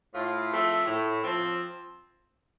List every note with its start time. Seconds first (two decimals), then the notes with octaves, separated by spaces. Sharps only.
0.14 A2 F4
0.51 F3 A3 C4
0.87 A2
1.24 F3 C4